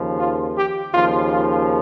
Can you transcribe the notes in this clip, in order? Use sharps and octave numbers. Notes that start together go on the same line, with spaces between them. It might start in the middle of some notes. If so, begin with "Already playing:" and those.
Already playing: D#2 C#3 F3
F4
G4
D#2 C#3 F3 F4
F4